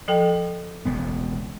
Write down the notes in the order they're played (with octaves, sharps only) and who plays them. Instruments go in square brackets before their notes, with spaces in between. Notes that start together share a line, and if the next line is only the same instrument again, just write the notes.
[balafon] F3 A4 G5
[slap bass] E1 C#2 B3